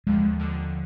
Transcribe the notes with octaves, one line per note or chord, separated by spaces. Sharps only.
D#2 D3 F3 G#3
D#2 D3 F3